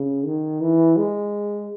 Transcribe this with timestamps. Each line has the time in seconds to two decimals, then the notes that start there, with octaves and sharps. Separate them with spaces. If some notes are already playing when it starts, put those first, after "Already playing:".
Already playing: C#3
0.26 D#3
0.61 E3
0.97 G#3